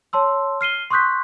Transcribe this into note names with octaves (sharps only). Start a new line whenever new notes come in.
C#5 A5 C6 E6
F6 C7 D#7 G7
C6 C#6 D#6 F#6 G6 B6